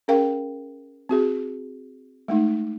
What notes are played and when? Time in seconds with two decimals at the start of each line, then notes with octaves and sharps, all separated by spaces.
0.08 C#4 G#4 A#4 F5 G5
1.09 C4 F#4 G#4
2.28 G#3 A3 D#4